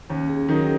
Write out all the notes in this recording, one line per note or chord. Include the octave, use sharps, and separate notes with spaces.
D#2 C#4
G#4
D#3 F#3 D#4 A#4
G#4